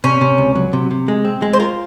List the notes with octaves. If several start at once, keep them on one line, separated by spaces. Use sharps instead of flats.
C3 C#4
C3
C#2
F#3
C3
C3
G#3
C4
G#3
C5
F4 A#4